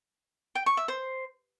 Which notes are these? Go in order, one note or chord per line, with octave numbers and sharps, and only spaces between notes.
G5
C#6
E5
C5